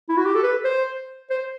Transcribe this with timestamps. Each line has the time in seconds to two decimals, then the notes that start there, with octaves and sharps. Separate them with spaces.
0.09 E4
0.17 F#4
0.25 G4
0.35 A4
0.43 B4
0.64 C5
1.30 C5